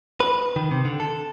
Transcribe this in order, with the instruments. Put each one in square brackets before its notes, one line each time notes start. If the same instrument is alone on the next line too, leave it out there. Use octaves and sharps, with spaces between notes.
[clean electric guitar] B4
D#3
C3
D3
A4